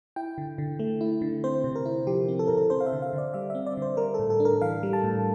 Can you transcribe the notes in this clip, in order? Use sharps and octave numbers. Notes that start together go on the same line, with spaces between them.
E4 G5
D3
D3
A3
E4
D3
C4 C5
C3
A#4
E4
F3 G4
C4
A4
C3 A#4
A4
C4 C5
F5
E5
D3
F5
D3 D5
G3 E5
C4 E5
D5
D3 C5
G3 A#4
A2 A4
A4
D4
A#4
E3 F5
G3
A5
A2